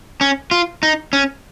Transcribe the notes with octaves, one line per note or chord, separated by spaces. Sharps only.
C#4
F4
D#4
C#4